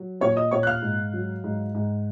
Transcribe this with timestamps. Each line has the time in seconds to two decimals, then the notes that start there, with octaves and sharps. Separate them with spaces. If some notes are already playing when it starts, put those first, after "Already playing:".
Already playing: F#3
0.21 A#2 C#5 C#6
0.36 D#5 D#6
0.51 A#2 C#5 C#6
0.63 F#6
0.67 F5 F6
0.82 G#2
1.13 F#3
1.44 G#2
1.75 G#2